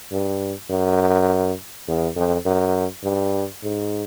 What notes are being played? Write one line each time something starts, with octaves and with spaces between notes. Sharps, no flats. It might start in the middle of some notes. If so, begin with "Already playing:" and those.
G2
F#2
E2
F2
F#2
G2
G#2